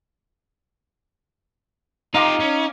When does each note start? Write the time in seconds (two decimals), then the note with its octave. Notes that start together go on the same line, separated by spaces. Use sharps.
2.14 D#4 F4 G4 F5 A#5 D6
2.40 C#4